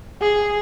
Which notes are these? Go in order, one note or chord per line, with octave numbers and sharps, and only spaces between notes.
G#4